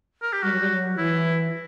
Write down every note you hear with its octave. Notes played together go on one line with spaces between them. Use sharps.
A#4
G4
G3 F#4
F#3
G3
F#3
E3 E4